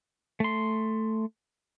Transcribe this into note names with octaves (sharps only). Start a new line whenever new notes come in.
A3 C6